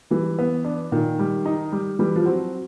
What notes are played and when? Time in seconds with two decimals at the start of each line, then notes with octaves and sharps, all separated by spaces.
0.10 E3 G3
0.39 B3
0.65 D4
0.92 A#2 D#3
1.19 G3
1.46 D#4
1.72 G3
1.99 E3 G3
2.16 F3
2.26 F#3 C4